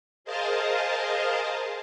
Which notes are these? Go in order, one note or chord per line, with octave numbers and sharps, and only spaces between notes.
G#4 A#4 C5 D#5 F5 A5